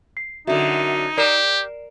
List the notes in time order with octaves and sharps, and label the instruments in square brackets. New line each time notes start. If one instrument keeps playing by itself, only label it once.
[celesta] C7
[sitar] F#2 D3 [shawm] D#4 [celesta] F#4 E5
[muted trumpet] G4 [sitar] A#4 [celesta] D5 C7 E7